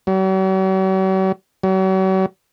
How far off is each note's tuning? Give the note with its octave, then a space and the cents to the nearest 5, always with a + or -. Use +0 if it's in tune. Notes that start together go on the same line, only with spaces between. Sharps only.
F#3 +45
F#3 +40